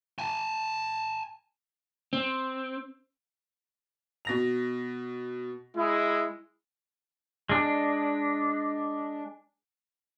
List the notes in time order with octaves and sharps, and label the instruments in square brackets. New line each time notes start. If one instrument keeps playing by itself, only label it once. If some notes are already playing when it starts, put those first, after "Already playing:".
[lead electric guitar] G#5 A5
[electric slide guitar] C4
[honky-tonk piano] B2 A#6 F7
[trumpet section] G#3 E4
[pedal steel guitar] G#3 D4